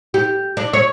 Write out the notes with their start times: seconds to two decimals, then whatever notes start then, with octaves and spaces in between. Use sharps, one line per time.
0.14 G4
0.57 D4
0.73 C#5